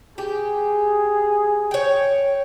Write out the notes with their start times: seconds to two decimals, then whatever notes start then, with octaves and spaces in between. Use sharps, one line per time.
0.18 G4 G#4
1.71 C#5 G5